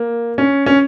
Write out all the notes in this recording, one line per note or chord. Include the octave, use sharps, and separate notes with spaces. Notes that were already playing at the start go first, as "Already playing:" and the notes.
Already playing: A#3
C#4
C#4